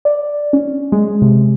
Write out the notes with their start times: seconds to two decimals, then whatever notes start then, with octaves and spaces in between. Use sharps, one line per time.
0.05 D5
0.53 C#4
0.92 G#3
1.22 C3